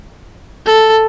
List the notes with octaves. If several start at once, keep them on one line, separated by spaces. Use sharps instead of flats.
A4